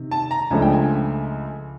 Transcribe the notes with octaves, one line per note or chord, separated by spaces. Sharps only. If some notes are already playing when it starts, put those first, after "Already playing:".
Already playing: C3 D#3
A5
A#5
C#2 C#3 F3 A3 D4 G#5
G5
G#5